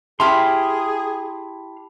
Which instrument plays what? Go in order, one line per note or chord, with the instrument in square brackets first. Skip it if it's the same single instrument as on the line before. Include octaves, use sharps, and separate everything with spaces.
[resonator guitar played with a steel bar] E4 G4 [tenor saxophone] G#4 [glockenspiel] A5 B5 [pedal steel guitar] C6 F6